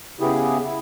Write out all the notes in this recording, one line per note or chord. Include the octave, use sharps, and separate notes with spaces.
C#3 B3 E4 G4 G#4
E4